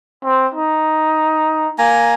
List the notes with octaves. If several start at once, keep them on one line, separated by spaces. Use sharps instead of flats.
C4
D#4
A#3 G#5 A#5